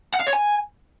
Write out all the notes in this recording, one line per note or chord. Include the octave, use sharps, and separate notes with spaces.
F#5
F5
C#5
G#5